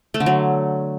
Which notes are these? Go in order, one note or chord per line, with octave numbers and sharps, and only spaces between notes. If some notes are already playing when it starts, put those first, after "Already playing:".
A3
D3
F#3